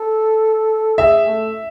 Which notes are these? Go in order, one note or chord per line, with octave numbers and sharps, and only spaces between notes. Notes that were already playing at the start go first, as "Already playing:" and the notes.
Already playing: A4
G#4 E5
A3